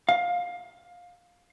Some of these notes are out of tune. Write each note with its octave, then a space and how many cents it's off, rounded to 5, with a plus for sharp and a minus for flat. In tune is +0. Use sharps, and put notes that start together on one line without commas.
F5 +20